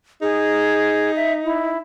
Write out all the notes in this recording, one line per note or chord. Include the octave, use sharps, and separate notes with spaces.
D#4 G#4
E5
E4